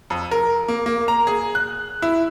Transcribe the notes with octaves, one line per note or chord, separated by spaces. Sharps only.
F2
A#4
A#3
A#3
A#5
G#4
F#6
E4